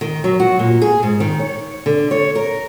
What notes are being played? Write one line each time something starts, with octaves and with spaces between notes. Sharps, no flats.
D#3
F#3
F#4
A#2
G#4
G#2
D#3
C#5
D3
C#5
A#4